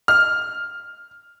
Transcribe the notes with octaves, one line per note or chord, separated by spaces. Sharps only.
F6